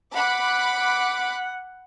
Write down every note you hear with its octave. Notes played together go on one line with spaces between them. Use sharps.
F#5 B5 D6 F#6